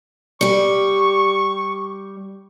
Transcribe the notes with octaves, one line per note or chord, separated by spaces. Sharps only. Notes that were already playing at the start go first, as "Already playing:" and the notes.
G3 G4 C#6